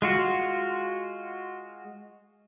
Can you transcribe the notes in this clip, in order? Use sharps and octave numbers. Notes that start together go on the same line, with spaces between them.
G#3 F4 F#4